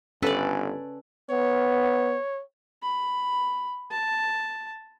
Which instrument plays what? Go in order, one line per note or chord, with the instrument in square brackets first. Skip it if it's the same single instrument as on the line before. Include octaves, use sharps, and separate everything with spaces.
[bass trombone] G1 [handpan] C#4 [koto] A4 [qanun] B4 D5
[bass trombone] B3 [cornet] C#5
[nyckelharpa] B5
A5